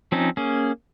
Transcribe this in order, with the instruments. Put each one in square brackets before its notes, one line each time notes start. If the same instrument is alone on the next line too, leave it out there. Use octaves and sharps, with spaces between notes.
[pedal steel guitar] F3 C4 C#4 D#4
A#3 C#4 G#4